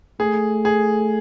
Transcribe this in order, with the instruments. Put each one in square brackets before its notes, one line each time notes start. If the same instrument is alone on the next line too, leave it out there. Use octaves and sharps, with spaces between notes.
[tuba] A3 [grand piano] G#4
[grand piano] G#4